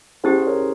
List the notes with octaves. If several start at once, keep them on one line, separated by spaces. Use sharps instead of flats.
C#4 E4 G4 G#4 C5
C5
A#4 C#5